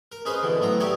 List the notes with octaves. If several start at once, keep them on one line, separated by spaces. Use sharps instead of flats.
A#4
C#4 D#4 G#4 B4 C5 D#5
B2 D3 E3
A2 F#3 B3 A#5
D#4 E4 G4 C#5 D5